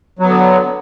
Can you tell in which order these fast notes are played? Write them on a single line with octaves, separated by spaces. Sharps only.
F#3 B3 D3